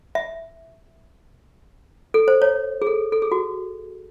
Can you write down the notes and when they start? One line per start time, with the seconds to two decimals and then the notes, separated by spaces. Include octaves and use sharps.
0.15 E5
2.14 A4
2.28 C5
2.42 C#5
2.82 G#4
2.87 A4
3.12 A4
3.22 G#4
3.32 F#4